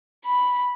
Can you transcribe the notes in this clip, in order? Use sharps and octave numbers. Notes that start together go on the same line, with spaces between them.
B5